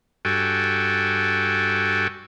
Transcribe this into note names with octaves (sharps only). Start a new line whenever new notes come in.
G2 F#4 A4 G5 G#5